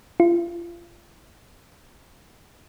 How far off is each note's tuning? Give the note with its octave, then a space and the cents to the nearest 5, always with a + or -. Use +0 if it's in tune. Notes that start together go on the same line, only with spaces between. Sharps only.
F4 -30